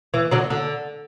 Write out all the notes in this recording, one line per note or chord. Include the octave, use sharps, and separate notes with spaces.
E3
D3 F#3
D3